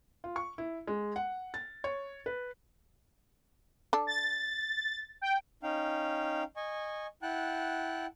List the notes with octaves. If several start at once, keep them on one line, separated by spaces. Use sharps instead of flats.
F4
C#6
E4
G#3
F#5
A6
C#5
B4
D4 A4
A6
G5
C#4 D#4 F5 G5
D#5 G#5 C#6
E4 F#5 G5 A5 F#6